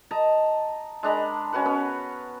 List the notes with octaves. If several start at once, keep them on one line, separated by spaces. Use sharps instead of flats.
D#5 A5 A#5
G#3 D4 A#5 B5
C#4 F#4 B4 F#5
B3 C#4